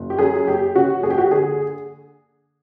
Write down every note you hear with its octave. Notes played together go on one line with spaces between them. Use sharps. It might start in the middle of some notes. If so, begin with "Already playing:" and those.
Already playing: F#1
G4
F#2 G#4
F#1 G4
C#3 F#4
F#1 G#4
G4
F#4
G4
D3 G#4